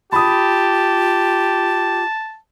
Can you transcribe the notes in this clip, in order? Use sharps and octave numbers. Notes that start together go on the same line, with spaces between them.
F4 G4 A5 B5 D#6